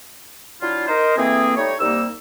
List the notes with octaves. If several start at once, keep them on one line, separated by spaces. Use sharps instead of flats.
F#3 D4 E4 F4
D#4 A#4 C5
E3 A3 A#3 C4 G#4
G3 A3 D#4 C#5
C2 G3 A#3 D#4 E6